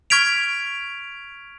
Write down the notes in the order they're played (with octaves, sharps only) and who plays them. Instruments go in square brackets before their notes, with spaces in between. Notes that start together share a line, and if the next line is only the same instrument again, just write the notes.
[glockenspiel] C#6 F6 G#6 B6 D7 F7